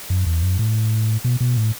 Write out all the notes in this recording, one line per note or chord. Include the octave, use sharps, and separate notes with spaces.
F#2
E2
F#2
A2
B2
B2
A2